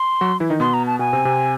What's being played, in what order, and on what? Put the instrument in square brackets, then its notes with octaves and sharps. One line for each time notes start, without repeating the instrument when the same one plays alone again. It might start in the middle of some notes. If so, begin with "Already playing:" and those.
Already playing: [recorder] C6
[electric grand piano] F#3 F#4
E3 E4
D#3 D#4
[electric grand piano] B2 B3 [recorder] C6
[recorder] A#5
A5
[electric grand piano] B2 B3 [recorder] G#5
[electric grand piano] C3 C4
C3 C4